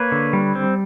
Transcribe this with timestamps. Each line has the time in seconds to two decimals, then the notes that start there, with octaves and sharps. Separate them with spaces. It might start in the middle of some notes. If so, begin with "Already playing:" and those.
Already playing: A#3 B4 C#5
0.12 D3
0.33 G3
0.55 C4